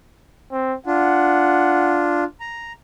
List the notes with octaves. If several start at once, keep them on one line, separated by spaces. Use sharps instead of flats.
C4
D4 F4 F#5
A#5